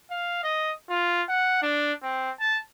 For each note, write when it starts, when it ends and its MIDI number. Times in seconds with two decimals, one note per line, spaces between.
0.10 0.43 77
0.43 0.72 75
0.90 1.23 65
1.29 1.61 78
1.62 1.93 62
2.03 2.31 60
2.40 2.59 81